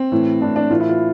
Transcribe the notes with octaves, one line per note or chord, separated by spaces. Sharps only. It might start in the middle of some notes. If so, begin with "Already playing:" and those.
Already playing: C4
A2 E3
A2 E3 D4
D4
A2 E3 F4
E4
F4